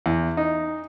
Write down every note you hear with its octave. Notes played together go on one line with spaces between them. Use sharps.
E2
D#4